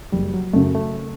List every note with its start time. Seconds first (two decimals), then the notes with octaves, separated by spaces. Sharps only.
0.12 F#1 G3
0.34 F#3
0.53 F#2 C#3 A3
0.75 A3